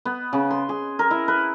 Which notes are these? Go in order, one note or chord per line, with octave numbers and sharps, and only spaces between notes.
B3
C#3
C6
G#4
A#4
E4
B4